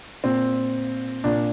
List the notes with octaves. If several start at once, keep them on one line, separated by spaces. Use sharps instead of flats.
A#2 C4
A#2 D4